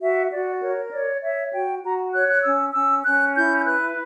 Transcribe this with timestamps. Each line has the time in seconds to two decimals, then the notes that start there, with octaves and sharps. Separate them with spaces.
0.01 F#4 E5
0.30 F#4 D5
0.61 A#4 C#5
0.91 C#5 D5
1.22 C#5 E5
1.53 F#4 G5
1.83 F#4 A#5
2.14 C#5 F#6
2.29 F#6
2.44 C#4 E6
2.74 C#4 E6
3.05 C#4 F#6
3.36 E4 G6
3.58 G6
3.66 B4 F#6